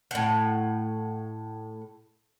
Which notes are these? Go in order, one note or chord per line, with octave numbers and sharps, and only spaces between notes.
A2 F#5